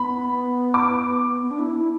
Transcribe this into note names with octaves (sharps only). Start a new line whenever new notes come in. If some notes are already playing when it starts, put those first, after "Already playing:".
Already playing: B3 B5
D6
B3
D4
E4
E4